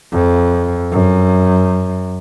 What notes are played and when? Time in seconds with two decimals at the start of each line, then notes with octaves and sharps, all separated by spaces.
0.13 F2
0.92 F#2